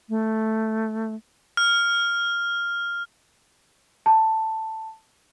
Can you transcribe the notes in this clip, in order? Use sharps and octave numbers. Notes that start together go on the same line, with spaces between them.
A3
F6
A5